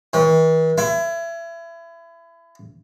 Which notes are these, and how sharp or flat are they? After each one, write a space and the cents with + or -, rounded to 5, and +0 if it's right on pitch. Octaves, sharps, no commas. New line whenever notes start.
E3 -45
E4 +30